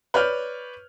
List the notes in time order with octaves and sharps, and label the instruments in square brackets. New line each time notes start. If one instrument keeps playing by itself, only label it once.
[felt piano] B4 C#5 D5 F6 G6